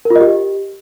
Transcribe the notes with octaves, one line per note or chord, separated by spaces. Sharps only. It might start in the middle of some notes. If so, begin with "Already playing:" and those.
A#4
F4
D#5
G4